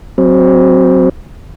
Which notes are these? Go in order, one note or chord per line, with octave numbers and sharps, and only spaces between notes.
F#3 C4